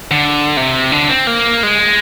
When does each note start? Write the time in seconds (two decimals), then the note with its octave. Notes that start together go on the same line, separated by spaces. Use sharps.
0.11 D3
0.57 C3
0.92 D3
1.09 C4
1.27 A#3
1.63 G#3